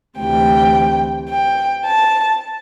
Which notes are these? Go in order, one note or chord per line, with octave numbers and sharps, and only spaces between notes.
D2 C3 E3 G5
G5
A5